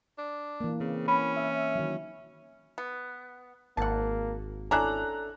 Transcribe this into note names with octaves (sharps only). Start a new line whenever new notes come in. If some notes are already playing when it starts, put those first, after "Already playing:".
D4
E3 A#3
C#3 C4
C#4 B5
E5
D#3 F#3
B3
G#1 A#3 F#5 A5
C#4 D4 E4 A4 A#5 F#6